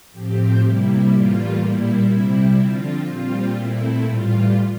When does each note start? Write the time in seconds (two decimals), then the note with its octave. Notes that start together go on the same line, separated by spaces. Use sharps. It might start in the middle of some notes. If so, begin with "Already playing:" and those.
0.12 A2 F3 C4 G4
0.60 C3 G3 A#3 E4
1.09 A2 E3 G3 A#3 F4
1.58 A#2 G3 A#3 E4
2.08 C3 G3 C4
2.56 D3 F3 C4 F4
3.05 A#2 G3 C4 F4
3.54 A#2 A3 C4 E4
4.03 A2 E3 G3 F4